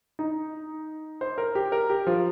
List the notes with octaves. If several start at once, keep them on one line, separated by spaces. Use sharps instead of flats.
D#4
C5
A#4
G4
A#4
G4
F3